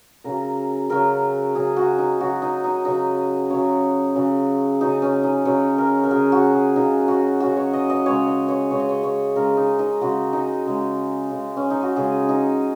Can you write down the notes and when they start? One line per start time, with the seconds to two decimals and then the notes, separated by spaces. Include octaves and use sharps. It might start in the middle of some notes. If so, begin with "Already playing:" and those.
0.24 C#3 F#3 A#4
0.89 C#3 F#3 A#4
1.55 C#3 F#3 G#4
1.76 F#4
1.98 D#4
2.20 C#3 F#3 F#4
2.42 D#4
2.64 D#4
2.85 C#3 F#3 D#4
3.50 C#3 F#3 C#5
4.16 C#3 F#3
4.81 C#3 F#3 D#4
5.02 C#4
5.23 D#4
5.45 C#3 F#3 C#5
5.78 A#4
6.04 A#4
6.10 C#3 F#3 G#4
6.32 F#4
6.54 G#4
6.76 C#3 F#3 D#4
7.08 F#4
7.40 C#3 F#3 F#4
7.56 C#5
7.73 D#5
7.90 D#5
8.06 C#3 G#3 C#5
8.27 D#5
8.49 C#5
8.70 C#3 G#3 C#5
8.80 D#5
8.89 C#5
9.03 C#5
9.36 C#3 G#3 A#4
9.57 D#4
9.79 D#4
10.01 C#3 G#3 F#4
10.33 D#4
10.66 C#3 G#3
11.31 C#3 G#3
11.57 C#4
11.70 D#4
11.83 F#4
11.96 C#3 G#3 G#4
12.29 D#4